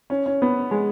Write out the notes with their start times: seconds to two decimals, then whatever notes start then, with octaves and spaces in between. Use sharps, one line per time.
0.10 C#4
0.26 C#4
0.42 B3
0.71 G#3